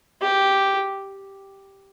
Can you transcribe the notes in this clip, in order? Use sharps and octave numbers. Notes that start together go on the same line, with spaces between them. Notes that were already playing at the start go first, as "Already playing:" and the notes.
G4